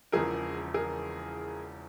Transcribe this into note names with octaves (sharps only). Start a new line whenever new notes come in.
E1 E2 C#3 F3 G#4 A#4
G#4 A#4